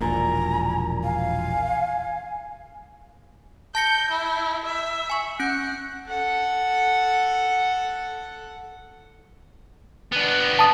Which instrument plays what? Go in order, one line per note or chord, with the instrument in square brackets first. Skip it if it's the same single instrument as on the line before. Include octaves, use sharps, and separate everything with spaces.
[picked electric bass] E1 A#1 A#2 [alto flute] G#5 [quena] A#5
[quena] F5 [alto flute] G#5
[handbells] A5 A#6 C#7 [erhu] G6
[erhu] E4
E5
[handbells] G#5 C#6
[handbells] C#4 G6 C#7 [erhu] F#5
[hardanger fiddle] A4 F#5
[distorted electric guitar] B3 D4
[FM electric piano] A5 D#6